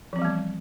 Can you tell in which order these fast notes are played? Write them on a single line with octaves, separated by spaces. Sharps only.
F3 C4 E3 G3 B3